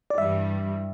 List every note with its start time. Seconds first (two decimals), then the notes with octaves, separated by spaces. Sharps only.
0.10 D5
0.18 G2 E3 G3 E5